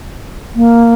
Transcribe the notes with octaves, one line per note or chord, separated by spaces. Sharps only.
A#3